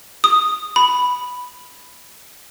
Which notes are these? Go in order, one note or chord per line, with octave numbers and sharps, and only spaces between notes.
D#6
B5